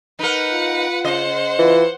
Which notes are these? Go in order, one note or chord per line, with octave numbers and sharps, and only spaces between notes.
D#4 A#4 B4 F#5
F4
C#3 C5 D#5 F#5
E3 F4